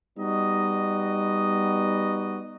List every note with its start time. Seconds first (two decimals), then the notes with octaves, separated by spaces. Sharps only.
0.18 G3 B3 D#4 F#4 D#5